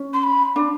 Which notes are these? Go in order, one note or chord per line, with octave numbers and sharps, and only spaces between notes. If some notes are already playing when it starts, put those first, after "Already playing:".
Already playing: C#4
C6
B5
D4